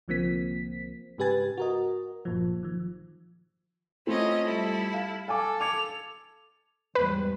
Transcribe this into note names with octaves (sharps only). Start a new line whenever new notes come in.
C2 D3 F3 A#3 C4 B6
G#2 C#3 G4 B4 G#5 A6
F#4 A#4 D#5
G1 A#2 F3
D#3 F3
A3 C4 C#4 E4 F4 D#5
G3 E4 A4
F5
A4 F5 G#5 D6
D6 G#6 C#7 F7
E2 G#2 G3 B4